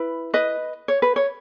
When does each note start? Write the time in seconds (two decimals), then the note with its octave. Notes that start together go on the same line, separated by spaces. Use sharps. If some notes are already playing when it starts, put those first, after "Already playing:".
Already playing: E4 B4
0.34 B4 D#5
0.88 C#5
1.02 B4
1.16 C#5